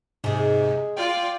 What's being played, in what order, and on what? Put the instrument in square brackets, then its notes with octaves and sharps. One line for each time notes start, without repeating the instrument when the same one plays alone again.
[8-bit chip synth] G#2 C3 [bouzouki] G#3 G#4
[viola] F4 D5 [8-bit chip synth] G5